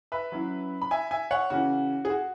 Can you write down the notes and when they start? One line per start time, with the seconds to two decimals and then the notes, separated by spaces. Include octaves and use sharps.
0.12 B4 E5
0.32 F#3 C#4 E4
0.82 B5
0.91 E5 G#5
1.11 E5 G#5
1.31 C#5 F#5
1.50 C#3 E3 C#4 F#4
2.05 G#4
2.10 F#4